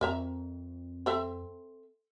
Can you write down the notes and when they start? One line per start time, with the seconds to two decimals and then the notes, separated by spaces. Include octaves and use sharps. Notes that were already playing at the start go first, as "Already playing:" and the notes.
0.01 F2 A#4 E5 A#5
1.06 C4 A4 E5